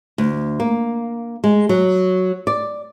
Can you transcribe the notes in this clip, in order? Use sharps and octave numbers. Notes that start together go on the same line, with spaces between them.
D2
A#3
G#3
F#3
D5